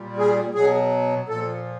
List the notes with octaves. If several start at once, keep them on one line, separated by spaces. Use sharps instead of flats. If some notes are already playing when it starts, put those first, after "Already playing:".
Already playing: A#2 G3
G#4
B2 F#3 G#4
A#2 F3 A4